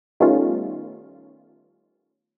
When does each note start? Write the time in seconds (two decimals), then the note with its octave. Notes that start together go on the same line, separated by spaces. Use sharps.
0.20 D#3 G3 A3 B3 C#4 F4